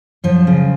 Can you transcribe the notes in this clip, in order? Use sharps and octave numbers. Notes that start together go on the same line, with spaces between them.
F#2 F3
C#3